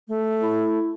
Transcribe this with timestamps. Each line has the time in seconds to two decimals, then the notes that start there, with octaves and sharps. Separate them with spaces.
0.08 A3
0.41 E4